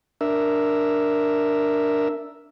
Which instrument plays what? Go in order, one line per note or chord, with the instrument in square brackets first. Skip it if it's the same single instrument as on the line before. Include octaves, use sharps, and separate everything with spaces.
[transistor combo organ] D4 A#4 E5